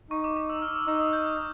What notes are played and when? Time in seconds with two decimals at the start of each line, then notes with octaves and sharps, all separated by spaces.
0.11 D#4 C#6
0.24 D6
0.37 D6
0.50 E6
0.62 F6
0.75 E6
0.87 D#4 D6
0.96 E6
1.00 D#6
1.13 G6
1.26 G6